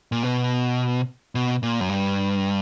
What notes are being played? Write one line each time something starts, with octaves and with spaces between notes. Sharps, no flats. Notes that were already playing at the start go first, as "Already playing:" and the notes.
A#2
B2
B2
A#2
F#2
G2